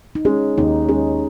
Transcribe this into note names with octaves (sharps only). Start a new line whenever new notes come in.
D#4
G#3 C#4
D#2 D#4
G#3 C#4